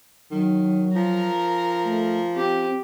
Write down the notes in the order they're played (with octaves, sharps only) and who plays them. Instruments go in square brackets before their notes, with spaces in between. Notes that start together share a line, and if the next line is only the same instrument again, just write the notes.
[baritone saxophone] D#3 [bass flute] F#3
[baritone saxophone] F3 [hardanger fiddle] A#4 A#5
[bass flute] A3
[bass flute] C4 [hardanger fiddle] G4